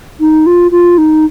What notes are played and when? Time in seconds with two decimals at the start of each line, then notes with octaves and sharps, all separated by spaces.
0.20 D#4
0.46 F4
0.71 F4
0.98 D#4